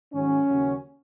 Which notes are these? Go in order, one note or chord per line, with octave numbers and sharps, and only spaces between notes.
G#2 D#3 F#3 C#4
D#2 C#3 F#3